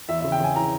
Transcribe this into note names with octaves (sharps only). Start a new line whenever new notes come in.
E2 E5
C#3 E5
G5
C#3 G#5
E3 A#5